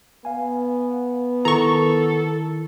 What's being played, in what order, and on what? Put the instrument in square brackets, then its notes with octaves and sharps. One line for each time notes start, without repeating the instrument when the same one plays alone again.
[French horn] B3 [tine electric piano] F5 G#5
[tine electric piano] D#3 E4 A#4 [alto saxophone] A4 [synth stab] A#5 C#6